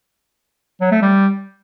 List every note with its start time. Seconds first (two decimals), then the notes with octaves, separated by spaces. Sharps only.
0.81 F#3
0.91 A3
1.02 G3